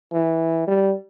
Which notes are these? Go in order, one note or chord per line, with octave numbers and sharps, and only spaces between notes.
E3
G3